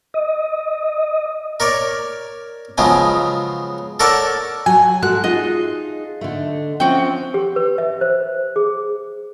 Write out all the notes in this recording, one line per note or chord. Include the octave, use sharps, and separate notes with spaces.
D#5
A#4 C#5 D5
C#3 F3 F#3 G#3 B3
A4 A#4 C#5 D5 F#5 A5
F#3 G#5
G#3 F#4 A4 F#6
D#4 F4 G#4 D#5
D3 A3
F3 C4 C#4 F#4 G5
G4
B4
E5
C5
G#4